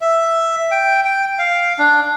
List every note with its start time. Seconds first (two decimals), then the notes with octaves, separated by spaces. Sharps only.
0.01 E5
0.71 G5
1.05 G5
1.39 F5
1.79 D4